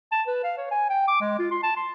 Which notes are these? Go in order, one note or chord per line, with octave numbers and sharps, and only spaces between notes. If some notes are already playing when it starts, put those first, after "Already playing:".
A5
B4
F5
C#5
G#5
G5
D6
G#3
F4
C6
A5
C6